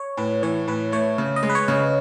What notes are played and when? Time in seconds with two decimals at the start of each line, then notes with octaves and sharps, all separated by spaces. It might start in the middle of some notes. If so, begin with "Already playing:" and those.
Already playing: C#5
0.17 A2 B4
0.43 E3 C#5
0.68 A2 B4
0.92 A3 C#5
1.18 C#3
1.36 D#5
1.43 G#3
1.50 B4
1.55 C#5
1.68 C#3